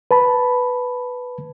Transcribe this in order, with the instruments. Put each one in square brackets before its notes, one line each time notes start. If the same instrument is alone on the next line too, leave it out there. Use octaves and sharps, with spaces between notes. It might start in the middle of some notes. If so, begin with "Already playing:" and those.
[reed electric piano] B4 A5 B5